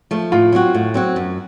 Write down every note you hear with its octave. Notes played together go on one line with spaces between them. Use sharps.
F3 A3
A2 F4
F#3 C4 F#4
A2
F#3 C4 F#4
F#2